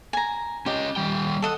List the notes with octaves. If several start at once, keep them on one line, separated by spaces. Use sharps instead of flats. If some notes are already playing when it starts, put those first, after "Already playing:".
G#5 A#5
C#4 G4 C#5 D#5
D#3 G3 G5
A4 D#5 F#5